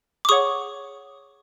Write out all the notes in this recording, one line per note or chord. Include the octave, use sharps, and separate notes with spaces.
D6
G#4 C#5 F#5 C#6 D#6